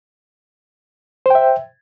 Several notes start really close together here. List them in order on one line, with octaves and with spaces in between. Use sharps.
C5 G5 E5